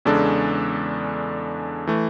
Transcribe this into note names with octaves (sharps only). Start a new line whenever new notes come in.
E2 C#3 G#3 D4 A4
E3 A3